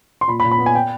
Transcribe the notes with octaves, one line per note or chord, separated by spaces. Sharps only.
C6
A#2 B5
B5
A#2
B5
B3
G#5
G5